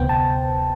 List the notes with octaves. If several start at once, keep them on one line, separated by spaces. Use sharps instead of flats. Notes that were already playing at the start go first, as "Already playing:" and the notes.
Already playing: D2 C3 B3 C5 G5
A5